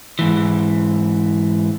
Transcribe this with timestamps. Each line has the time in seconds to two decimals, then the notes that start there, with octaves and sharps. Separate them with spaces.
0.19 G#2 E3